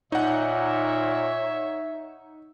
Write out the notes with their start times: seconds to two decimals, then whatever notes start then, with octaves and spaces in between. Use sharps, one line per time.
0.12 A#2 D#4 C#5 E5 F#5